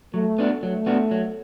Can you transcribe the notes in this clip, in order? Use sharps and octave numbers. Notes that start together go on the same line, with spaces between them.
F#3 A3
B3 D4 F#4
F#3 A3
B3 D4 F#4
F#3